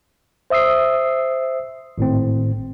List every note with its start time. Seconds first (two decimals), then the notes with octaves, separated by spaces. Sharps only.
0.50 C5 E5 D#6 E6 C7
1.98 G#1 A2 C4